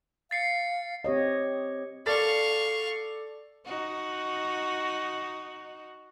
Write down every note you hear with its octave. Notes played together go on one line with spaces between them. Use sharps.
F5 A6 C7 C#7
C4 G4 C#5 D#5
A4 D5 F5 C#6 A6
D#4 F#4